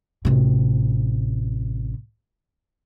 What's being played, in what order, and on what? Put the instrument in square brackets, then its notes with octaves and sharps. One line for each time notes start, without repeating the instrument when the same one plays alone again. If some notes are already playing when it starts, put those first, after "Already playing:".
[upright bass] A1 C3